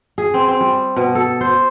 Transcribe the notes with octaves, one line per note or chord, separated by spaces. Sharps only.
G#4
C4
C4
G3
B2
A4
C5